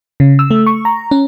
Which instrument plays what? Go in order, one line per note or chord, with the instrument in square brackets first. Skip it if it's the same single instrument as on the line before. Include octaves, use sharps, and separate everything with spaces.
[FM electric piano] C#3
E6
A3
C#6
A#5
C#4